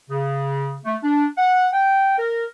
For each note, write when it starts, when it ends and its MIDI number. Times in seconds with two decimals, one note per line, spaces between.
0.09 0.77 49
0.85 0.96 57
1.03 1.27 62
1.37 1.67 78
1.72 2.15 79
2.18 2.46 70